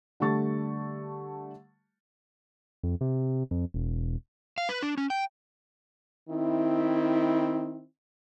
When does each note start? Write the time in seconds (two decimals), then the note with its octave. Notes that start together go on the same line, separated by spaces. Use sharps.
0.20 D3 G3 A3 C#6 A6
2.83 F2
3.01 C3
3.51 F2
3.74 E1
4.58 F5
4.69 B4
4.82 D4
4.98 C#4
5.10 G5
6.30 D#3 C4 E4